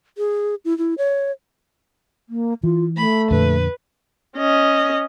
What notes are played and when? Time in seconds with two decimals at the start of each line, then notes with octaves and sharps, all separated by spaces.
0.18 G#4
0.65 E4
0.78 E4
0.98 C#5
2.29 A#3
2.64 E3 F4
2.97 A3 B5
3.31 F2 A#2 D3 B4
4.37 C#4 D#5